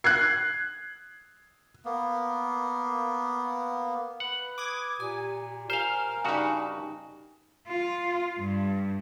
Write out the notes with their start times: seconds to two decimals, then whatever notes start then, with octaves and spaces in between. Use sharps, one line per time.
0.04 F#6 G#6 C7
1.85 A#3 B3
4.20 B4 F#5
4.58 D6 D#6 G#6
5.00 A#2 G4 G#5
5.70 A#4 C5 F5 G#5 F6
6.25 G2 C#3 D#4 F#4 G4 D5
7.68 F4
8.39 G2